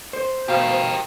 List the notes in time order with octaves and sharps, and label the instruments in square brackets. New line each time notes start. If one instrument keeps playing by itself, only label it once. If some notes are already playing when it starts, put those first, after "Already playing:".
[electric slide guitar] C5
[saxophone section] B2 F5 [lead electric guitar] G4 A#4